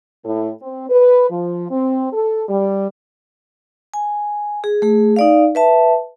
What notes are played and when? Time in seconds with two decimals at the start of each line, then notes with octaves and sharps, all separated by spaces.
0.25 A2
0.62 C4
0.90 B4
1.30 F3
1.70 C4
2.12 A4
2.49 G3
3.94 G#5
4.64 G#4
4.82 A3 G#4
5.16 D#4 D5 F5
5.55 B4 E5 A5